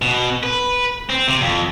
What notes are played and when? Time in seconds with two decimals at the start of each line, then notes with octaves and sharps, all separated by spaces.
0.02 B2
0.43 B4
1.10 C4
1.27 C3
1.41 F2